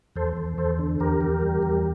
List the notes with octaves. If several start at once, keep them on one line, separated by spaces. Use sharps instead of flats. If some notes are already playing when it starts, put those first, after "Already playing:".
E2 A4 C5
E2
E2 A4 C5
D3
E2 G4 A#4
E2
G3
E2